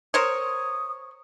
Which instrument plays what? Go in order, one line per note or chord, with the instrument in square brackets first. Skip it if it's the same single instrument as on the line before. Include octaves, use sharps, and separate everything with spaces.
[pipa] A#4 C5 C#5 [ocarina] D#6